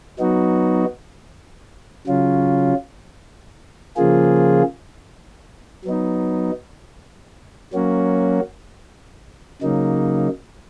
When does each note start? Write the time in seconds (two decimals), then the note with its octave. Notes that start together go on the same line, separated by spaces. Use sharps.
0.19 F#3 B3 D#4 F#4
2.07 C#3 F#3 C#4 F4
3.97 C#3 F3 A#3 F4 G#4
5.85 F#3 B3 D#4
7.73 F#3 A#3 C#4 F#4
9.62 C#3 F#3 A#3 D#4